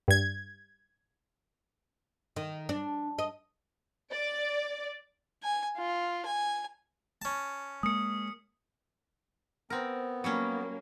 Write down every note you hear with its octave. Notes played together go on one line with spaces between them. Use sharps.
G2 G#6
D#3
D4
D#5
D5
G#5
F4
G#5
C#4 A5
G#3 A#3 D#6 C#7
B3 C4 A#4
F#3 G3 A#3 C#4